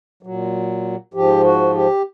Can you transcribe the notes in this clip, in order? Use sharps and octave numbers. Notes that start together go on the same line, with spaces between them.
A#2 F#3
G#2 F3 G4
F#4
G4